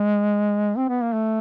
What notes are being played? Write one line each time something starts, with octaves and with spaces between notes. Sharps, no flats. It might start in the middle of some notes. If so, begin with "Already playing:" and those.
Already playing: G#3
C4
B3
A#3
A3